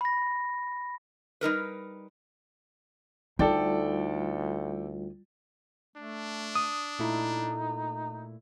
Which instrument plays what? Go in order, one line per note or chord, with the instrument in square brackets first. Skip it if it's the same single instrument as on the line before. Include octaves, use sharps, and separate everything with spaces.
[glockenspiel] B5 A#6
[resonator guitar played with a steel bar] G3 D#4 A#4 B4
[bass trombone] D2 [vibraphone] G3 F4 [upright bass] D#4 [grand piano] A4 D5 G5
[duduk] A3 [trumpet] D4
[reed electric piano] D#6
[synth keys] A#2 A3 E4 [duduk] D#4